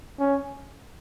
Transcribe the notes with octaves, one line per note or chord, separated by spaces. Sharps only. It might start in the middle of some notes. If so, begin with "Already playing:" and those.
C#4